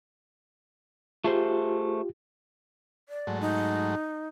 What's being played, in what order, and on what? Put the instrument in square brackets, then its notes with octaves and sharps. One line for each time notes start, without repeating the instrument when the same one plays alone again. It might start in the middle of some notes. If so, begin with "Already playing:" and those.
[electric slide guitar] A3 G#4 C5 [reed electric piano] F4 G4
[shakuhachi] D5
[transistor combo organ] G#2 F#3 A3
[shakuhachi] D#4